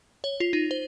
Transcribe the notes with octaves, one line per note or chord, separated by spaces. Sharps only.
C#5
F4
D#4
C5